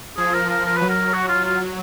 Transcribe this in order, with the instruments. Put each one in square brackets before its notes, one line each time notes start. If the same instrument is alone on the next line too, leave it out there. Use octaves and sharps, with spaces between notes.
[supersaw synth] F3 [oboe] G#4
[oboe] A#4
A#4
A#4
[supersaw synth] F#3 [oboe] B4
[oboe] A#4
F#4
F4
F4